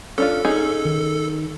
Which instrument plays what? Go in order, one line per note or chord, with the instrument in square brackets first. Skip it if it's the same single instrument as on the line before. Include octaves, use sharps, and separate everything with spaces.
[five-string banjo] C#4 D4 F4 [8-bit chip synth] A4
[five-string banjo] C#4 D#4 G#4
[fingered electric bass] D#3